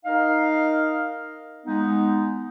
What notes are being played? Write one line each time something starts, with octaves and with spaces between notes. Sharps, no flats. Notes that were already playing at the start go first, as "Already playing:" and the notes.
D#4 A#4 D#5 F5
G#3 B3 D#4